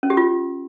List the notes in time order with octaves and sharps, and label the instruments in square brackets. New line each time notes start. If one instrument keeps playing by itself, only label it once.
[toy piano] C#4
G4
F4